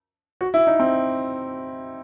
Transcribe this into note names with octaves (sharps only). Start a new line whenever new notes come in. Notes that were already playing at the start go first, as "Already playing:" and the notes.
F#4
E4
D#4
C4